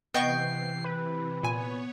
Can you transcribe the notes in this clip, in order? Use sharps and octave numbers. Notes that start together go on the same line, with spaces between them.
C3 E3 B3 D#5 G5 C#6 C7
B4
A#2 B3 C#5 G#5